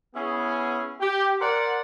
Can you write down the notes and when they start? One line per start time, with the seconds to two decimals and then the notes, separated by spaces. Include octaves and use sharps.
0.14 B3 C#4 E4 G#4
1.00 G4
1.40 A#4 C5 D5 F#5